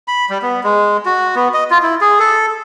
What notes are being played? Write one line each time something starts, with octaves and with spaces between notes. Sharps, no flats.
B5
G3
B3
G#3
F#4
B3
D#5
F4
E4
G#4
A4